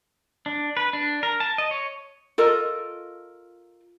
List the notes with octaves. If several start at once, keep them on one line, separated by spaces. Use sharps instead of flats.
D4
B4
D4
A#4
A5
D#5
C#5
F4 A4 A#4 D#5